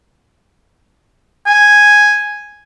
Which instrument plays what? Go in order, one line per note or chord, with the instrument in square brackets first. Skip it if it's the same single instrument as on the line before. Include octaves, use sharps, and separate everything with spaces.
[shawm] G#5